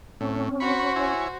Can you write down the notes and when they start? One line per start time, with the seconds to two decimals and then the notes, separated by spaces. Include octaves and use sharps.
0.21 A2 C4 C#4
0.60 F#4 C5 B5 C#6
0.96 E4 C#5 G#5